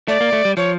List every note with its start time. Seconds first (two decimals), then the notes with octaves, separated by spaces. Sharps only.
0.08 A3 D5
0.21 A#3
0.33 A3
0.45 G3
0.57 F3 C#5